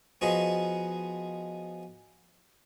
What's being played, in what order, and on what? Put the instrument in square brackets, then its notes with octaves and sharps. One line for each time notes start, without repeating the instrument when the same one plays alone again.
[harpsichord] F3 B3 D#4 F#4 G#4